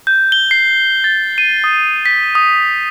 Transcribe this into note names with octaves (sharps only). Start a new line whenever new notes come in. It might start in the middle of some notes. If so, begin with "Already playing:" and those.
G6
G7
C7
A6
D#7
D#6
B6
D#6